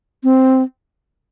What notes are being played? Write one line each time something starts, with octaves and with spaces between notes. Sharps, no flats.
C4